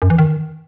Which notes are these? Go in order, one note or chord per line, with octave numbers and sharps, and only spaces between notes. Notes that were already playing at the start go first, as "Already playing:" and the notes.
F#2
E3
D#3